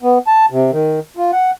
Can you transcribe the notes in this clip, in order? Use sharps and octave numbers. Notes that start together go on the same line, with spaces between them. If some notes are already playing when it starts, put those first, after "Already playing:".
B3
A5
C3
D#3
F4
F#5